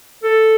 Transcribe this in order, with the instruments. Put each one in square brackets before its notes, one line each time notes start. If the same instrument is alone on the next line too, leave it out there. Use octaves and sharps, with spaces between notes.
[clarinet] A4